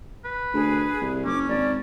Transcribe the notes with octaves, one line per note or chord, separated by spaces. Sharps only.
B4
D2 G#4
C2
F#1 C#4 D6
G#1 D5